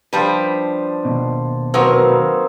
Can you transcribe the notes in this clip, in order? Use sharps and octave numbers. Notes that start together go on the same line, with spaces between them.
F3 G3 D4 B4 C5
D#2 B2
E2 F#3 A#3 C4 D#4 F#4 A#4 B4